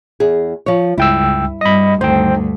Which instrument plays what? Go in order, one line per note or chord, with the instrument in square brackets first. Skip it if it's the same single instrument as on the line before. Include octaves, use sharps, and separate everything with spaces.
[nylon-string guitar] E2 G#4
F3 C#5
[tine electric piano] C#2 G5 E6 [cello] G2 [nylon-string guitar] E4
[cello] G2 G3 [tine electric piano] D#5 B5
[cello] D2 G2 [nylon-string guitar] D#3 [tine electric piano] C5 G5